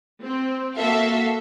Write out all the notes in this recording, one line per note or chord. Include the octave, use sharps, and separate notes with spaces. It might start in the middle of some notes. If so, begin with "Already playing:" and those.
C4
A#3 F#4 A4 E5 F5